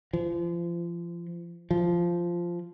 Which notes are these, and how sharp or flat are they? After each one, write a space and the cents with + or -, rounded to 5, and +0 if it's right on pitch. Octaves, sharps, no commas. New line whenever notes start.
F3 -30
F3 -10